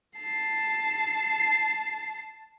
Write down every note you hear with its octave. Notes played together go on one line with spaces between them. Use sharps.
A5 C7